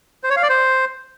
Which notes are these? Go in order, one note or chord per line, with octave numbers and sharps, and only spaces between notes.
C5
C#5
F5
D5
C5